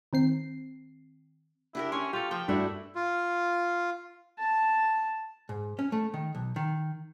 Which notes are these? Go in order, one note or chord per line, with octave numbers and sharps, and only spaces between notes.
D#3 C4 C7
D4 E4 G4 A#4
C#4 C#5 C6
F4 G4 A4
F3 G5
G2 A3 D4 E4 F#4
F4
A5
G#2
C#4
A3
D#3
B1
D#3